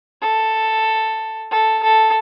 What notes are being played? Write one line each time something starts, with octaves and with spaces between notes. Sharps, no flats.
A4
A4
A4